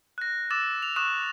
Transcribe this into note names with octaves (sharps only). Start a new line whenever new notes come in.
F#6 A#6
D6 E6 A6 E7
F7
C#6 D#6 F#6 E7